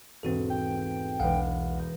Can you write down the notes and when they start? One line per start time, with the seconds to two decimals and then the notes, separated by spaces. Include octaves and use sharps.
0.23 E1 G#2 C4 F#4 A4
0.50 G5
1.20 E1 B1 G#3 A#3 F5 F#5
1.76 A#5 D#6 G6